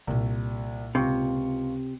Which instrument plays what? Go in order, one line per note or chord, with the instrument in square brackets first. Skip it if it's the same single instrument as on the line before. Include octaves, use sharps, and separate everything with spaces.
[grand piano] C2 [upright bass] A#2 A#3
[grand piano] C#2 F4 C#6 [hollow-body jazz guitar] C3